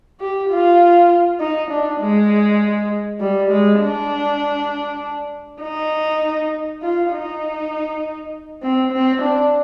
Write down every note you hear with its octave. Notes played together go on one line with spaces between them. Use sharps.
G4
F4
D#4
D4
G#3
G3
G#3
D4
D#4
F4
D#4
C4
C4
D4